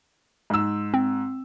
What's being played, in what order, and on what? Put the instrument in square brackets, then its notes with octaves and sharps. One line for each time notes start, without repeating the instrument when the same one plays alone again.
[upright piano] G#2 E6
[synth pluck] C4